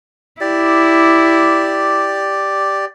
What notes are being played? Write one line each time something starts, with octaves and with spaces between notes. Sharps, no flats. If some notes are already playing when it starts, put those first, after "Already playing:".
E4 G4 D5